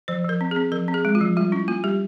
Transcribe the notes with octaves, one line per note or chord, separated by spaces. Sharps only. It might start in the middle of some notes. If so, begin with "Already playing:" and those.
F3 C5
F3 A#4
C4
C4 G#4
F3 A#4
C4
G#4
G#3
F4
F3
G3 F4
C#4 E4
A#3 F4
G3 G4